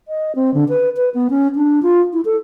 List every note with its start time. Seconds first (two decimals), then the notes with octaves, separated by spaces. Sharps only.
0.08 D#5
0.35 C4
0.54 D3
0.69 B4
0.97 B4
1.14 B3
1.30 C#4
1.55 D4
1.83 F4
2.13 E4
2.25 A4